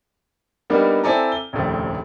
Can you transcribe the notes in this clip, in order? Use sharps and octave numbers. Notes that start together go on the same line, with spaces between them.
G3 A#3 B3 D4 D#4 A#4
C4 E4 A4 D5 G#5 A#5
G7
F1 A#1 D#2 C#3 F3 A3